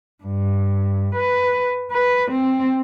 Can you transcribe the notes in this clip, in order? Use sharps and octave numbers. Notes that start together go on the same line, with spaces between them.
G2
B4
B4
C4